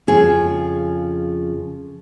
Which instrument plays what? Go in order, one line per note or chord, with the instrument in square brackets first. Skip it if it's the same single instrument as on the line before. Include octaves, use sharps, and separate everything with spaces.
[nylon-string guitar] F2 C#3 F3 G#4